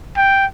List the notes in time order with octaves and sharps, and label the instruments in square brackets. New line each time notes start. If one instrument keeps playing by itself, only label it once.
[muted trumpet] G5